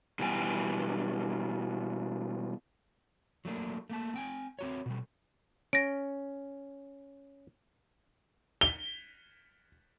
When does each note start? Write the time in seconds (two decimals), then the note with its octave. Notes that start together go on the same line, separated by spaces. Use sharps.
0.19 B2 E3 G3 G5 G#5
3.45 F#3 A3 A#3 D4
3.90 A3 A#3 A5
4.14 C4 G5 G#5
4.59 C4 F#4 C#5
4.86 B2 G3
5.73 C#4 A#6 D7
8.61 G7